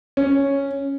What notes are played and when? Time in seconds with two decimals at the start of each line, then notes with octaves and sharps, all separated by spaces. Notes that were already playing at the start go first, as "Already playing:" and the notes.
0.17 C#4